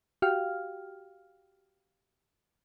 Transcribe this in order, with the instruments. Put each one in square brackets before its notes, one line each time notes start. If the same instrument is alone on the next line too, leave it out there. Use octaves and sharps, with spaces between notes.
[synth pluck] F#4 G4 F5 G5 F6